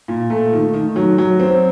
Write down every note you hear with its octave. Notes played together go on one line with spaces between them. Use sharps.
A#2
A3
D#3
D#3
F#3
F#3
C4